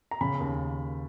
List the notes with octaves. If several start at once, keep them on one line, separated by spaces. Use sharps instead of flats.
A#5
C#3 B5
D#2